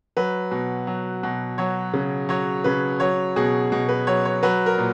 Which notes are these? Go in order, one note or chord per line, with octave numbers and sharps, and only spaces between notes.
F#3 B4
B2
F#3
B2
F#3 C#5
C#3
F#3 C#5
C#3 B4
F#3 C#5
B2 G#4
B2
B4
F#3 C#5
C#5
F#3 B4
A#4
A#2